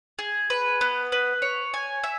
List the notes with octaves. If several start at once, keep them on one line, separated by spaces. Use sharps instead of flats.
G#4
B4
B3
B4
C#5
G#5
E5